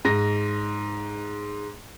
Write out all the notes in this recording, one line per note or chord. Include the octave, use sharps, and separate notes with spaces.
G#2 A#6